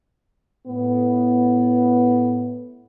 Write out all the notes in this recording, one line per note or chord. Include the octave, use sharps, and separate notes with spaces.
A2 B3